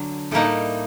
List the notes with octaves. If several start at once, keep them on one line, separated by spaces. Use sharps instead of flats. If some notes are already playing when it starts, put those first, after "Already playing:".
Already playing: D3 F#3
A2 G3 A#3 D#4 A4